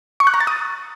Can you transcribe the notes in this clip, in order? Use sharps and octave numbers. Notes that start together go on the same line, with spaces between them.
C#6
F#6
A#5
A6
D#6